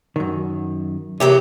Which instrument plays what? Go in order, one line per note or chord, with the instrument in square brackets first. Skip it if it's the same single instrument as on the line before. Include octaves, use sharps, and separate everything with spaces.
[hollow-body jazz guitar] F#2 D#3
[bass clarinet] C3 [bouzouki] E3 F#3 G4 [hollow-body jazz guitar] A#3 G#4